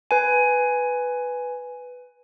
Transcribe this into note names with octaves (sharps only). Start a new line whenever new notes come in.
B4 G#5